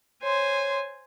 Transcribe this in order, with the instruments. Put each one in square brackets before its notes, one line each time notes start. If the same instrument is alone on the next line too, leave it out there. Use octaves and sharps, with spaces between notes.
[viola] C5 G#5 [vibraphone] C#5 C6